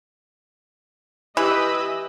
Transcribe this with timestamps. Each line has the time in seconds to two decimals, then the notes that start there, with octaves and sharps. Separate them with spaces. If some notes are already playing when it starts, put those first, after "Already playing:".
1.37 E3 G4 B4 D#5 E6